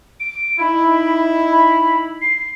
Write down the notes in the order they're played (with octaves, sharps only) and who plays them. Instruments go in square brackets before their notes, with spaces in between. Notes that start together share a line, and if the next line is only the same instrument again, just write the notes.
[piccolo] D7
[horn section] D#4 E4 [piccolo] B5
[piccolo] B5
C7